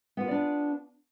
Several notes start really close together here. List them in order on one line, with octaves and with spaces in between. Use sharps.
B3 F4 B4 D5 D4